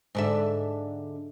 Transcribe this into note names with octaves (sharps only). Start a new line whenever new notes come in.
G#2 D3 E5